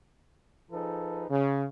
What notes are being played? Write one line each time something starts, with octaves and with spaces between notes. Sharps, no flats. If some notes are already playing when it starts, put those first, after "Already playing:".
F3 D#4 G#4 A4 B4
C#3